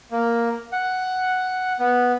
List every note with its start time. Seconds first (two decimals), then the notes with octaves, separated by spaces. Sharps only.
0.11 A#3
0.72 F#5
1.79 B3